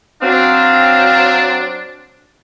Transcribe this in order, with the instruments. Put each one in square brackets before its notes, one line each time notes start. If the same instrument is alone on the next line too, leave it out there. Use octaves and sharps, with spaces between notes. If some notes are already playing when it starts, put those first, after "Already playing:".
[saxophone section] F#3 C4 [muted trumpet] D4 [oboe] F5